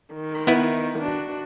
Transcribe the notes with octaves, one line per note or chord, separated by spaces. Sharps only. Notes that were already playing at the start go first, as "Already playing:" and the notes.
D#3
B3 E4 B4
D4 F#4